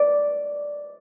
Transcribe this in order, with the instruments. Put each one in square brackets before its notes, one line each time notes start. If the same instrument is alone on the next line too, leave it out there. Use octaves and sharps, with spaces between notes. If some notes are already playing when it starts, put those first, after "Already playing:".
Already playing: [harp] D5